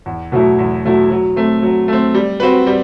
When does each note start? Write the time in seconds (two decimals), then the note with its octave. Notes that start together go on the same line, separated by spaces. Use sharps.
0.06 E2
0.32 B2 F#3 A3 E4
0.59 E2
0.85 B2 F#3 A3 E4
1.10 F#3
1.36 A3 C4
1.62 F#3
1.88 A3 C4
2.15 G3
2.40 C4 F#4 B4
2.67 G3